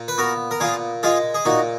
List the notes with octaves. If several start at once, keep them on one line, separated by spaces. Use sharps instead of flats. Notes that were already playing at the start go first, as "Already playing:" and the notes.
Already playing: A#2
B4
B3 F#4 A#4
A#4
A#2 F4 G#4
G#3 F4 G#4
G#4
A#2 D#4 F#4